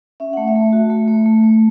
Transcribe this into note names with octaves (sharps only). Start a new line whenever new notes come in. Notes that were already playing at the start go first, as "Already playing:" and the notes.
C#4 E5
A3 F#5
E5
A3
F#4
A3
A3
A3
A3